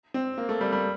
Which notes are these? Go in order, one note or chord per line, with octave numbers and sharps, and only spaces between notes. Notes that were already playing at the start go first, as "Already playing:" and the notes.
C4
A#3
A3
G3
G3